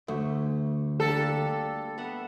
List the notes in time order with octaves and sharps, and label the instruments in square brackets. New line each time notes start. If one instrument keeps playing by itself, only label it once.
[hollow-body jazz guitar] D2 [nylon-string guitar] A3
[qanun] G3 A#3 D4 [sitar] A4
[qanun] B3 E5 F#5